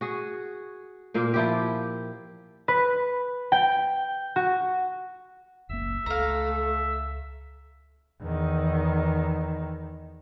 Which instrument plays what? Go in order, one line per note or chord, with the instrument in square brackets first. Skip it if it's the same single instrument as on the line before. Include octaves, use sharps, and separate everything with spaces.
[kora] F#4 G#4
A#2 A#3 C5
F3 E4 G4
[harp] B4
G5
F#4
[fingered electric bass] F#1 C#2 A#3 [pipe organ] E5 E6
[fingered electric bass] C#2 [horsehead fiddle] A3 A4 [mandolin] F5 A#5
[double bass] E2 D#3